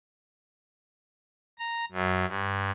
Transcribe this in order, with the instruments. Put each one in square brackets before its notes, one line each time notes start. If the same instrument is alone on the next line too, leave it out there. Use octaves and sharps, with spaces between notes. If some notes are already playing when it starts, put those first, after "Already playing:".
[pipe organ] A#5
F#2
G2